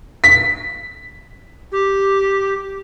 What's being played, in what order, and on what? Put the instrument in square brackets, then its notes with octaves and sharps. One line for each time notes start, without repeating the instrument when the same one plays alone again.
[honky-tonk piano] B6
[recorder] G4